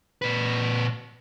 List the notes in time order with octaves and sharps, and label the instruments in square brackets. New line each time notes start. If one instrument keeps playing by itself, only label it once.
[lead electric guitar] A#2 B4